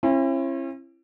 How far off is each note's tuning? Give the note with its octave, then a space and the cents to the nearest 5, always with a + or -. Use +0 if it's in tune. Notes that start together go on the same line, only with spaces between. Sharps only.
C#4 -45 E4 +30